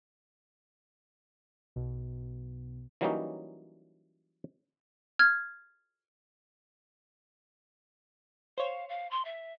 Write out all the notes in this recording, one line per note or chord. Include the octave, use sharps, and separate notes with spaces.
B1 B2
E3 F#3 G3 A#3 C#4 D#4
F6 G#6
C5 C#5 F5
F5
C6
E5